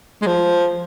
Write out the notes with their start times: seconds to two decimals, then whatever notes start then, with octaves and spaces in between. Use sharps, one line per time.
0.22 G#3
0.27 F3